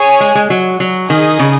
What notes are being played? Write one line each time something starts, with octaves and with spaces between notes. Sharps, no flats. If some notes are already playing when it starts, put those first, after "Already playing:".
Already playing: G#4 C#5 G#5
G#3
G#3
F#3
F#3
D#3 D#4 G#4 D#5 G#5
C#3